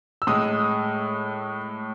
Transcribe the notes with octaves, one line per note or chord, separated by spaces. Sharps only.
E6
A2 G#3 D#6